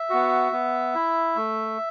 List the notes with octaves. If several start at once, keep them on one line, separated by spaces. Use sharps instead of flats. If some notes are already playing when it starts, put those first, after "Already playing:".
Already playing: E5
B3 F#4
B3
E4
A3